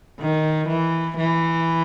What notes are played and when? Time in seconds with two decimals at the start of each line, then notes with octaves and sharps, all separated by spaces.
0.19 D#3
0.68 E3
1.17 E3